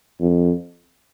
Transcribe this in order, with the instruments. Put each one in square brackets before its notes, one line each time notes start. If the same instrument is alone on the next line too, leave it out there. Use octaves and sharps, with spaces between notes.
[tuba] F2